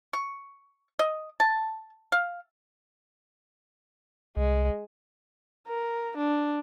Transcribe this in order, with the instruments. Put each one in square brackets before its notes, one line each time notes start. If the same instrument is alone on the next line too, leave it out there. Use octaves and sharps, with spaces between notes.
[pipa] C#6
D#5
A5
F5
[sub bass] C2 [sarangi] G#3
[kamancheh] A#4
D4